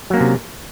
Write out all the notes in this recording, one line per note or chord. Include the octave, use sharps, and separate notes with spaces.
C3 F#3 A#3 C#4